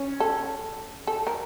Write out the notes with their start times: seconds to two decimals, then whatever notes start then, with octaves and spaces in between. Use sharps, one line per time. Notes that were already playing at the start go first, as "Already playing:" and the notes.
Already playing: C#4
0.20 A4
1.07 A4
1.27 A#4